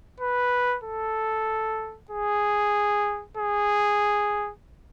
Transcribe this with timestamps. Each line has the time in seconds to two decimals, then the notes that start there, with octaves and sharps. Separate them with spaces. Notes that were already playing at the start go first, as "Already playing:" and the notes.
0.20 B4
0.83 A4
2.10 G#4
3.37 G#4